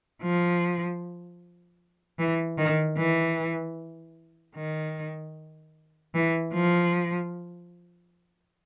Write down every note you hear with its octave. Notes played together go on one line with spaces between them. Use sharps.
F3
E3
D#3
E3
D#3
E3
F3